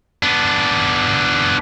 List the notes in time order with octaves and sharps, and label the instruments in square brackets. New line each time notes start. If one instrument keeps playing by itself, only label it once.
[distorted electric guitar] B3 D4